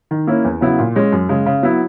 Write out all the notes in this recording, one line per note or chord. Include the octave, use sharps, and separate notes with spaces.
D#3
A#3 C#4 E4
E2
C#3 F#3 B3 E4
A#2
G#3 C#4
F#2
C#3 G#3
C#3
F#3 B3 E4